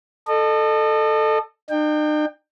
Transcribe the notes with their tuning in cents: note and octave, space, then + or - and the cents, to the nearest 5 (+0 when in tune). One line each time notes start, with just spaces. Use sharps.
A4 +0 D#5 -35
D#4 -45 G5 +15